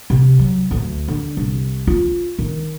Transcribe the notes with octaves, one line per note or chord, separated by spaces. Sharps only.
C3
F#3
D2
D3
C2
F4
D#3